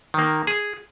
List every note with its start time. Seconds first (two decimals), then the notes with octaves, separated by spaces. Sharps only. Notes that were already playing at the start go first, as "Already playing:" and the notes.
0.14 D#3 A#3
0.47 G#4